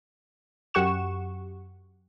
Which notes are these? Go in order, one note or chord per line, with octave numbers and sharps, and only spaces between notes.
F#2 G4 F#5 C#6 E7